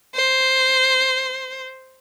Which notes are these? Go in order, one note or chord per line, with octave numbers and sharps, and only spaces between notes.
C5